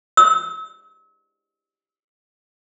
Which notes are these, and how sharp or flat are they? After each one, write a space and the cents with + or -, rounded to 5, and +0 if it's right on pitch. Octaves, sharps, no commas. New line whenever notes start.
E6 -40